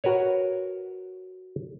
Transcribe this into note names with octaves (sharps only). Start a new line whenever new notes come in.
F#4 A#4 B4 C#5